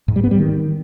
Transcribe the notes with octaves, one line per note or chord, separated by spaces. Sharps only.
G#2
G3
B3
G3
D#3